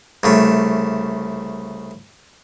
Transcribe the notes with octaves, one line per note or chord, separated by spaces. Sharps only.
C2 C#3 A3